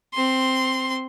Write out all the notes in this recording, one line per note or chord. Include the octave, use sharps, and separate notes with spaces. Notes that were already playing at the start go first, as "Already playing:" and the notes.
C4 C6